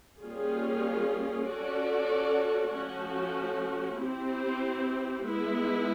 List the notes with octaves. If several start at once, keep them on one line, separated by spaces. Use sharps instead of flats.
G3 A#3 C#4 F4 G#4
C#4 F#4 A4 D5
F3 A3 C#4 F#4
C4 E4 G4 C5
G#3 B3 E4